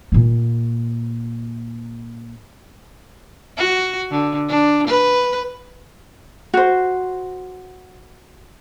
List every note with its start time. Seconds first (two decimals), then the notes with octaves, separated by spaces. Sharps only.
0.12 A#2 A#3
3.57 F#4
4.11 D3
4.48 D4
4.88 B4
6.54 F#4 C5